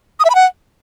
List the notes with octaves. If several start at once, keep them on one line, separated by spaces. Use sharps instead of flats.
D#6
E5
B5
F#5